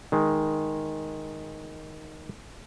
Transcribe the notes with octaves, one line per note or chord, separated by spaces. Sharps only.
D#3 G#3